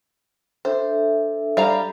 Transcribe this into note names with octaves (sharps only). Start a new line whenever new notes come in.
D4 A4 C5 E5
G3 F5 A#5